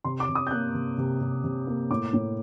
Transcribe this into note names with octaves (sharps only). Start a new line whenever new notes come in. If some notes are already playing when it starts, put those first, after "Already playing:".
C3 C6
D6
C3
D#6
G6
A#3 F#6
C3
C3
C3
C3
A#3
A2 D6
A2